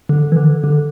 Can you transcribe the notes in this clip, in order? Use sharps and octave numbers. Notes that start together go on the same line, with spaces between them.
D3
E3
D3
D3